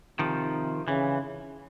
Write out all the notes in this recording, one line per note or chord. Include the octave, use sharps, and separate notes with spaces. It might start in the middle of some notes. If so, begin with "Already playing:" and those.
C3 D#3 F3
C#3 E3